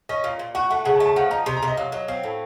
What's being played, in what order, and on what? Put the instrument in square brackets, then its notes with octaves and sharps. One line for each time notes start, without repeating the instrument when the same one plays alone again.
[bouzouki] C#4 [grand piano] D#5
[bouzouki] A#2 [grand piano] F5
[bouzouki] A#2
[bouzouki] F#4 [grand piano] F#5
[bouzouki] A3 [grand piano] F#5
[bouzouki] C#3 [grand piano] F#5
[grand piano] A5
[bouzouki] A3
[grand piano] A5
[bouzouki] F3 [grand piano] F#5
[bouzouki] D#4 [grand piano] A#5
[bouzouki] C3 [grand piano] C6
[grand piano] A#5
[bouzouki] C3 [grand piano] D#5
[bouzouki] F#3 [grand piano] F5
[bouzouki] F#3 [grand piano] D#5
[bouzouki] C4 [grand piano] F5
[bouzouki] A2